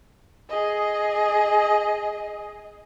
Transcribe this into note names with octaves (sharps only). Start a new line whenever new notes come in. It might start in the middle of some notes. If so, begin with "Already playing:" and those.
G#4 D#5